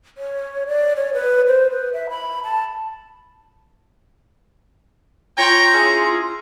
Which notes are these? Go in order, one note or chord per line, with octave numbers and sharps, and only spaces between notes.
C#5
D5
C#5
B4
C5
B4
E5
B5
A5
F4 C#5 G5 A#5
C#4 E4 G#4